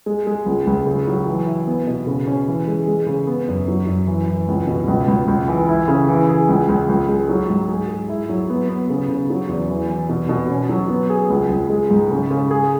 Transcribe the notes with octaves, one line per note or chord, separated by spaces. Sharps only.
G#3
G#3
C#2
C#2
C#3
F#3
E3
E4
B3
B2
C#3
C#4
E3
G#3
G#3
C#3
B3
F#2
F#3
F#2
E3
E3
C#2
B2
C#2
C#2
C#2
E3
E4
C#3
E3
G#4
C#2
C#2
C#2
G#3
F#3
G#2
G#4
G#4
E4
F#3
B3
B3
C#3
C#3
F#3
E2
E3
E3
B2
B2
C#4
F#3
B3
G#4
C#2
C#2
G#3
G#2
C#3
C#3
G#4